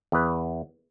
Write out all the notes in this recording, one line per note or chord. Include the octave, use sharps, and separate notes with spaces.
E2 B4